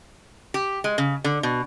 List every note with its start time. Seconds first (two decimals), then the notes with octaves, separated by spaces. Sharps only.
0.54 G4
0.84 G#3
0.98 C#3
1.24 D3
1.43 B2